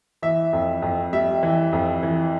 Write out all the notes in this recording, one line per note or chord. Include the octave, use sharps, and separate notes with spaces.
E3 E5
F2
F2
G3 E5
E3
F2
E3